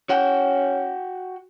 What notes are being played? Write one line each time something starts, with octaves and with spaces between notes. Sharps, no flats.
C#4 F#4 F#5 G5